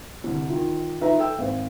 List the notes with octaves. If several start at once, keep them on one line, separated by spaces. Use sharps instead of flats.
C2 D3
D#3 F4
D#4 F4 B4 E5 A#5
A4 G5 E6
G#1 C5